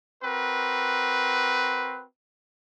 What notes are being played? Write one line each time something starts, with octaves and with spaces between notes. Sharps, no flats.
C4 F#4 A#4 B4